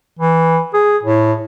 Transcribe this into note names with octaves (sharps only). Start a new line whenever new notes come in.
E3
G#4
A2